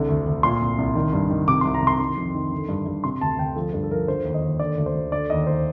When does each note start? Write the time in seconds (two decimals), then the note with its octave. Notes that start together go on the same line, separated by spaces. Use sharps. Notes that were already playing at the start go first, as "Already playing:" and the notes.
Already playing: C2 D3
0.09 D2
0.27 D2
0.43 A#2 C6
0.61 C2
0.78 C2
0.95 D#3
1.13 G2
1.30 D#3
1.48 C3 D6
1.61 C2 C6
1.74 A#5
1.82 C2 C6
1.99 D#3
2.17 F2
2.35 D#3
2.51 D3
2.69 G2
2.86 G2
3.04 C3 C6
3.21 D2 A5
3.39 D2 G5
3.56 F3 A4
3.73 G2 A4
3.84 A4
3.91 F3 A#4
4.08 D3 C5
4.25 D#2
4.34 D#5
4.42 D#2
4.60 D3 D5
4.78 D2
4.86 C5
4.94 D2
5.12 D3 D5
5.30 D#2 D#5
5.47 D#2 C5